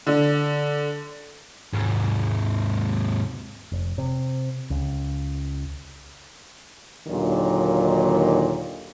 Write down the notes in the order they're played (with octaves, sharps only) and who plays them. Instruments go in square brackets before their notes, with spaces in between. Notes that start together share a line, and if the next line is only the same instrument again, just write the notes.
[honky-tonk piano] D3
[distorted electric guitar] D#2 G#2
[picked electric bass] F1
C3
C#2
[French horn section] D#2 A#2 D3 D#3 F#3